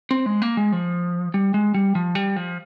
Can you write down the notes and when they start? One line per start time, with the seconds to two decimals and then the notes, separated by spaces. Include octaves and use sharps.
0.11 C4
0.26 G#3
0.42 A#3
0.57 G#3
0.72 F3
1.34 G3
1.54 G#3
1.74 G3
1.95 F3
2.15 G3
2.36 F3